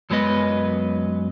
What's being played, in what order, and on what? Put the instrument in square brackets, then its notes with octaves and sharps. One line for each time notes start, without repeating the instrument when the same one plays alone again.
[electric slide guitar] F#2 F#3 G#3 B3 B4 D#5